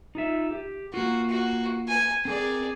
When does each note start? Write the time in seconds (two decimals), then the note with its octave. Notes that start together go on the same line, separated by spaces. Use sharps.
0.15 D#4 F4 E5
0.51 G4
0.94 A#3 F4 F#4
1.29 F#4
1.88 G#5
2.25 C4 G#4 A#4 D5